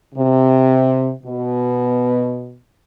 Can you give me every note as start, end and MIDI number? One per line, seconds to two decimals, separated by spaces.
0.15 1.10 48
1.24 2.57 47